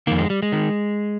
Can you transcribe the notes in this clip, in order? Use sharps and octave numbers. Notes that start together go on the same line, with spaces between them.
F2 D#3 A#3
G#3
G3
G#3
D#3